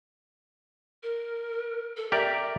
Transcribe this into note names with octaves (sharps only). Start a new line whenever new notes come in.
A#4
A4
G4 A#4 D5 E5